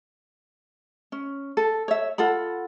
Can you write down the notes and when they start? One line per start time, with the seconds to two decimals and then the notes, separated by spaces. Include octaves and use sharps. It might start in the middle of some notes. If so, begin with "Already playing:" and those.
1.12 C#4
1.57 A4
1.88 C#5 E5
2.18 F4 A4 F#5 B5